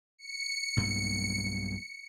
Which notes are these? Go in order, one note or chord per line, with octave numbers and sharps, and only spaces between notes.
C#7
B1 G2 A#3